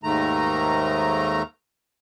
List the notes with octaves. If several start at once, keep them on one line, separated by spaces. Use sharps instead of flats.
D#2 G#2 D#3 A3 A#5